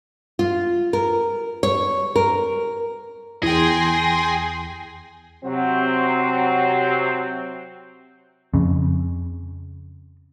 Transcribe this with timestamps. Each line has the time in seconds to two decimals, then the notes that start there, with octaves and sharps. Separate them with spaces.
0.39 F4
0.93 A#4
1.63 C#5
2.16 A#4
3.43 E2 G#4 G5 C6 A#6
5.45 C3 F#3 C4
8.54 F2 C#3